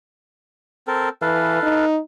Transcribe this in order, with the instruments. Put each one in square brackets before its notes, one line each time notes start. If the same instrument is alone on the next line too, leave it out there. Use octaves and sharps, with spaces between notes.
[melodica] C4 A4 A#4
[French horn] E3 [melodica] A4 B4 F5
[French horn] D#4